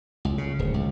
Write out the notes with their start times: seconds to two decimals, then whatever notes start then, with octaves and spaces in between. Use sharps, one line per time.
0.25 C#2
0.38 C#3
0.59 D1
0.74 C#2